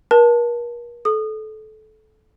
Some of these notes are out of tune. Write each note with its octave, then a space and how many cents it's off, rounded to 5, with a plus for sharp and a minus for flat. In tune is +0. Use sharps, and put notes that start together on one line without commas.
A#4 +40 A5 +0
A4 -25 D#6 -25